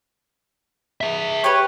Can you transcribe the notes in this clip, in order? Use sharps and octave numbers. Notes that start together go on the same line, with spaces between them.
G#4 E5
G4 B4 C#5